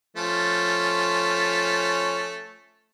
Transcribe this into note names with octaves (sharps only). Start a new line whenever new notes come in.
F3 A3 C#4